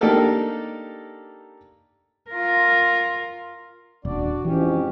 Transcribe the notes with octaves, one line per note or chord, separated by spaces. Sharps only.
A#3 D4 D#4 G4 A4 A#4
F4 A#4
D#1 D4 F#4 D5
F2 G#2 E3 C#4 G4